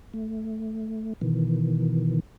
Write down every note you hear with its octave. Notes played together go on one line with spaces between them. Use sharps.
A3
B2 D#3 E3